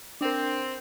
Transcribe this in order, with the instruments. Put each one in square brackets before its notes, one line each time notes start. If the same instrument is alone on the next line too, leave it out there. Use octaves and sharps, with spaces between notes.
[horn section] C4 [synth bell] D4 A#4